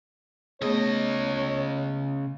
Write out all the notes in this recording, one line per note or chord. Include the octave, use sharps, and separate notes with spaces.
C#3 A3 B3 G#4 C#5 D#5